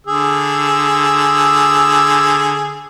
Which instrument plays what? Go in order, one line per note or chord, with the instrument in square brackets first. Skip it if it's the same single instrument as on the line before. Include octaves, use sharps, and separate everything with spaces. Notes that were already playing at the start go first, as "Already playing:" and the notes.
[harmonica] D3 G#4 E6